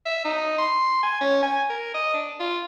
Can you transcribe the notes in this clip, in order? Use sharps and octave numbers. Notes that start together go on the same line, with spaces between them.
E5
D#4
C6
G#5
C#4
G#5
A#4
D#5
D4
F4